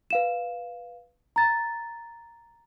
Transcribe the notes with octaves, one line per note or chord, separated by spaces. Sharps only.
B4 F5 E7
A#5 A6